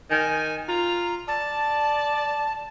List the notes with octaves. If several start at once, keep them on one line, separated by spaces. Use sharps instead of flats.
D#3 G#5
F4 A#5
D5 A5